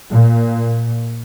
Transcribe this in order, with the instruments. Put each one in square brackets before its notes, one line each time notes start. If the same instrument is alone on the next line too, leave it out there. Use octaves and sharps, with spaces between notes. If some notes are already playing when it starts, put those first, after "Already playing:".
[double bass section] A#2